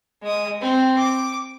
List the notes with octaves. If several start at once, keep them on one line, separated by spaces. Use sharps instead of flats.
G#3 D#6
C4
D6